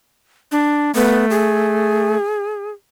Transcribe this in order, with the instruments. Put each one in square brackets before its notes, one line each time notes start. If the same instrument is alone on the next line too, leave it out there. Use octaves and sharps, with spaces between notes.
[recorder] D4
[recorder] A3 [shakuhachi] B3
[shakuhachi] G#4